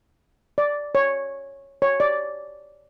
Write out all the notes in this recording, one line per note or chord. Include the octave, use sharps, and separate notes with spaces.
D5
C#5
C#5
D5